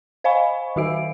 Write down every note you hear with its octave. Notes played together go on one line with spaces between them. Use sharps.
C5 D#5 F5 G#5 B5 C#6
D#3 D#4 F#4 E5 E6 D7